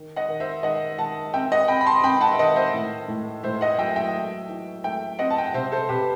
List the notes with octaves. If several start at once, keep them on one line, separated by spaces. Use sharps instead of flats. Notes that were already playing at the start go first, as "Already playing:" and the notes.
Already playing: D#3
D#5 F#5
D#3
C5 E5
D#3 D#5 F#5
D#3 F#5 A5
C4 E5 G5
D#5 F#5
C4 G5 B5
B5
A5 C6
C4 G5 B5
F#5 A5
E5
D#3 D#5 F#5
C5 E5
A2
A2
A2 C5 E5
D#5 F#5
F#3 E5 G5
E5 G5
A3
E3
A3 E5 G5
C4 D#5 F#5
A5
G5
F#5
C3 C5 E5
A4 C5
C3 G4 B4